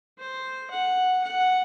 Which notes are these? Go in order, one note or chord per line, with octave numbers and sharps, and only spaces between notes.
C5
F#5
F#5